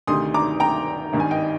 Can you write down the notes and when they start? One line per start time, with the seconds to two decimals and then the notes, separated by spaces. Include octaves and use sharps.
0.07 D2 C3 D#3 C6 D#6
0.34 A#5 D6
0.60 G5 A#5
1.13 G#1 G2 D#3
1.20 G#5
1.31 D#5 G5